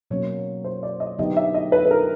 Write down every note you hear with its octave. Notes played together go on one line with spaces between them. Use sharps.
B2 F#3 A#3 C#4 C#5
C5
D5
D#5
D3 F#3 B3 D#4 G4 D#5
E5
D#5
B4
B4
A#4